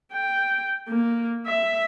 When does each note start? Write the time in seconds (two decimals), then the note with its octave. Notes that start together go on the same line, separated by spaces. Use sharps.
0.13 G5
0.88 A#3
1.47 E5